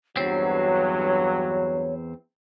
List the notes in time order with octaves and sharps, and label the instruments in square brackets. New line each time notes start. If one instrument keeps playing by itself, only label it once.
[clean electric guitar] E2 C4 [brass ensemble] G2 F#3 [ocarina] C#5